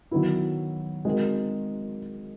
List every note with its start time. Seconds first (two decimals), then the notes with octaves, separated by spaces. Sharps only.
0.11 D#3 F#3 B3 E4
1.05 G#3 C4 D#4 F#4 A#4